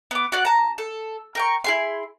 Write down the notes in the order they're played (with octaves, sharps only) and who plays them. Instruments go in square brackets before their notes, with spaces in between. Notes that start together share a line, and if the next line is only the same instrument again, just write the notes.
[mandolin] B3 D6
F#4 D5 F#5
A5 A#5
A4
A#4 G5 C#6
E4 G#4 C6